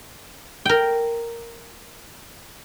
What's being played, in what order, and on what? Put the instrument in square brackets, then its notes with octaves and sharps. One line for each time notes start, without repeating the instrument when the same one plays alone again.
[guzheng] A#4 G5